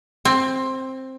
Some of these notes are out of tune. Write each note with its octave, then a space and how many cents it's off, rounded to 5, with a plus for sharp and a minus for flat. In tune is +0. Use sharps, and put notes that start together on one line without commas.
C4 +10